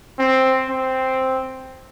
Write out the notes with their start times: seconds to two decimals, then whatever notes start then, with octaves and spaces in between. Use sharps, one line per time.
0.19 C4
0.69 C4